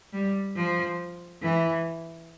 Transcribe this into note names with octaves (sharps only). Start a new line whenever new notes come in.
G3
F3
E3